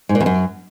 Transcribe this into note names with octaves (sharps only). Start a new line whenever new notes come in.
G#2
A#2
E2
F#2